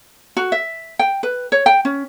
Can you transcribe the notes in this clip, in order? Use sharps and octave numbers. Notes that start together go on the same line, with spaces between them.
F#4
E5
G5
B4
C#5
G5
C#4